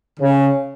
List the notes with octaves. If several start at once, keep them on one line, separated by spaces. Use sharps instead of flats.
C#3